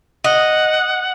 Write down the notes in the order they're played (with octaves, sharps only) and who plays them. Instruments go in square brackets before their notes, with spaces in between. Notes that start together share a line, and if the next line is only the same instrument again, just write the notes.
[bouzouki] D#5 [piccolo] F#5